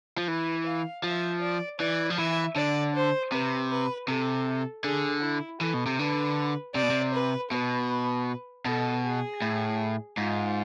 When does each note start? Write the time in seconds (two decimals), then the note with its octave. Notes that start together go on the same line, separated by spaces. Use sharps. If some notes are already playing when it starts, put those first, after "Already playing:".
0.18 F3
0.28 E3 B4
0.65 F5
1.03 F3 E5
1.41 D5
1.79 E3 D5
2.10 F3
2.18 E3 E5
2.56 D3 D5
2.95 C5
3.32 C3 B4
3.70 B4
4.08 C3 A4
4.84 D3 G#4
5.22 E4
5.61 E3 A4
5.74 B2
5.86 C3
5.99 D3 B4
6.75 C3 D5
6.83 B2
6.90 C3
7.13 B4
7.51 B2 B4
8.65 B2 A4
9.04 G#4
9.42 A2
10.17 G#2 F4